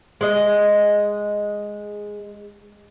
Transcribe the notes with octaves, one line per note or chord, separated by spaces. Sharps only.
G#3 D#5